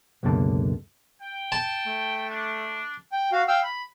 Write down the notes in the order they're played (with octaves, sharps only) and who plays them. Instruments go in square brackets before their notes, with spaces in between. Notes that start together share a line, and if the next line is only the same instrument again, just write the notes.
[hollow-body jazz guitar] C#2 F#2 B2 D3 A#3 A5
[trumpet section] G5
[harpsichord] A5
[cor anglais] A3
[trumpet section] D4
[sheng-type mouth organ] G5
F#4 F5
F5 G5 E6 F6
B5